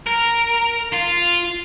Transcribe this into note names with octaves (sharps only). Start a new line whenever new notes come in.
A#4
F4